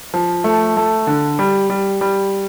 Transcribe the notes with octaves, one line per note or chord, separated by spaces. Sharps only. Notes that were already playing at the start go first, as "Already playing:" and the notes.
F3
A3
A3
D3
G3
G3
G3